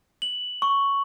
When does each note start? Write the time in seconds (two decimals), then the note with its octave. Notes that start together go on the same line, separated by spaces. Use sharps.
0.22 F#7
0.62 C#6